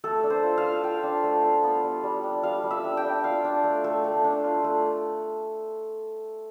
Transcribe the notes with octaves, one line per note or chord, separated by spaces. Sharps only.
A3 A4
D4
C5
F4
F5
F4
F4 G5
D4
A3
F4
B3
G3
G3
D4
G3 F5
G3
E5
D4
G5
D4
F4 F5
D4
A3
A3
A3
D4
F4
A3